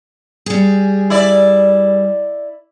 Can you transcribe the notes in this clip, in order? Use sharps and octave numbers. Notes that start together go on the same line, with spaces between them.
G3 G#4
E4 D5